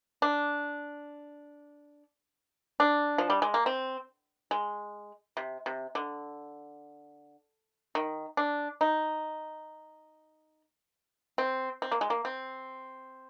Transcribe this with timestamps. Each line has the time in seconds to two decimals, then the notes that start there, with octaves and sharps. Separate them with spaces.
0.22 D4
2.80 D4
3.18 F3
3.30 G3
3.42 G#3
3.54 A#3
3.66 C4
4.51 G#3
5.37 C3
5.66 C3
5.95 D3
7.95 D#3
8.37 D4
8.81 D#4
11.38 C4
11.82 C4
11.92 A#3
12.01 G#3
12.10 A#3
12.25 C4